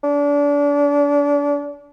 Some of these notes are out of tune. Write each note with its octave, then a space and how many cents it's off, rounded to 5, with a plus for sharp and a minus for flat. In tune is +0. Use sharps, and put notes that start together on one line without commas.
D4 -30